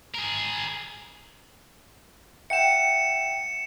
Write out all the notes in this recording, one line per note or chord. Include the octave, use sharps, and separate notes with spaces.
G#4 A#4
E5 F#5 G5 C#7 E7